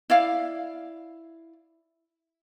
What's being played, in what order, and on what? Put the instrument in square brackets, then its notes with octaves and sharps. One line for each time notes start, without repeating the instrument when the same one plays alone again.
[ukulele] E4 D5 F5